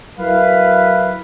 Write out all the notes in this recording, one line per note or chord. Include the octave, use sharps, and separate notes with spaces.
F#3 E4 A#4 B4 F5